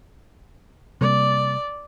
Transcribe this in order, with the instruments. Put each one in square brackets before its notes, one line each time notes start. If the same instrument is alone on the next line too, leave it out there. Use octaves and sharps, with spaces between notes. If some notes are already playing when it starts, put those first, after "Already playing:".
[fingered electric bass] C3 G3 A#3 [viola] D5